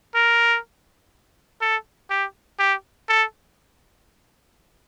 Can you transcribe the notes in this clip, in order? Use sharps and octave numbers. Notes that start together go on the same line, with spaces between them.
A#4
A4
G4
G4
A4